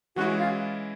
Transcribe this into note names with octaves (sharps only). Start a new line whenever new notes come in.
E3 G#3 C#4 E4 F#4
F4